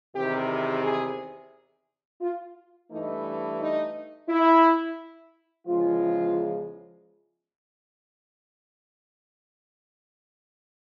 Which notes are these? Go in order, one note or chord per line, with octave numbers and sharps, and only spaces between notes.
E2 C3 D#3 G4
G#4
F4
G2 E3 A3 D#4
D#4
E4
E2 C#3 F3 G#3 F4